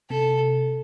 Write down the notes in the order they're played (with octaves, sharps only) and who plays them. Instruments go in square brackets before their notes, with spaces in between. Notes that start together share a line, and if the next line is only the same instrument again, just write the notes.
[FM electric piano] C3 [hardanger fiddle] A4